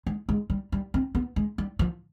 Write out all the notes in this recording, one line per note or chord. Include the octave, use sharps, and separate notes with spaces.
G#3
G#3
G3
G3
C4
B3
G#3
G3
F3